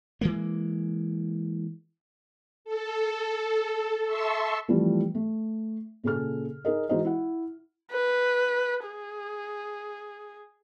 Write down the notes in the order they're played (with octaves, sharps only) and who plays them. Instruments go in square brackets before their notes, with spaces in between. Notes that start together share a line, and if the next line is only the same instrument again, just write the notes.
[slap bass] E3 G#3 A#3
[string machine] A4
E5 A5 C6 C#6 E6
[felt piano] E3 F3 G3 A3 C4 F4
A3
A#2 C#3 G#4 A4 F6
D#4 G#4 A#4 D#5
E3 G#3 D#4 F#4 C5 D#5
E4 F#5
[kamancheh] B4
G#4